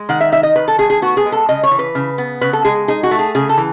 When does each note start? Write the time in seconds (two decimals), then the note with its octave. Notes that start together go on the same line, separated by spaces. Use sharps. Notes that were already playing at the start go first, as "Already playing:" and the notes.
Already playing: G#3
0.09 D#3 F#5
0.21 E5
0.32 D#4 E5
0.43 D#5
0.56 D#3 B4
0.68 A4
0.78 A3 G#4
0.90 G#4
1.02 B3 F#4
1.17 G#4
1.26 G#3
1.32 A4
1.49 C#3 D#5
1.63 C#5
1.71 E3
1.79 B4
1.95 C#3
2.18 B3
2.41 C#3 B4
2.53 A4
2.65 G#3 G#4
2.88 D#4 G#4
3.03 F#4
3.11 A3
3.19 G#4
3.35 C#3 G#4
3.49 A4
3.57 E3